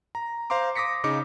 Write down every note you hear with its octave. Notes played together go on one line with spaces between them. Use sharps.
A#5
C5 F5 A#5 C6 D6
D6 D#6 A#6 B6 C#7
C#3 D#4 D6 C#7